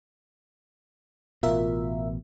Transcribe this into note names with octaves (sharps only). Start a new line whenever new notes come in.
A1 B2 F4 A#4 E5